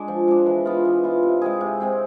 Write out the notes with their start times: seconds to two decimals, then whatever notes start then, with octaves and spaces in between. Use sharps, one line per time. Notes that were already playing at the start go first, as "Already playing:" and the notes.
Already playing: G#3 D4
0.08 F3
0.28 G#3 D4
0.46 E3
0.66 B3 F4
0.85 E3
1.04 B3 F4
1.23 C3
1.41 G#3 C4 G#4
1.61 C3
1.80 G#3 C4 G#4